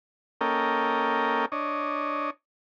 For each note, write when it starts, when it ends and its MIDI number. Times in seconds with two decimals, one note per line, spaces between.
0.41 1.46 58
0.41 1.46 61
0.41 1.46 69
0.41 1.46 70
0.41 1.46 75
0.41 1.46 79
1.52 2.30 62
1.52 2.30 73
1.52 2.30 75